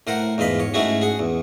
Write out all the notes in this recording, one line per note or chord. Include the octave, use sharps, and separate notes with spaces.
A2 A#4 C5 F#5
E2 G#2 F4 D#5 B5
C#5
G#2 A3 C#4 E4 F#4 G#4
G#4 F#5
E2